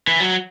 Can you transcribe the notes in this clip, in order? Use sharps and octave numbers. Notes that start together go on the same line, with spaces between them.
E3
F#3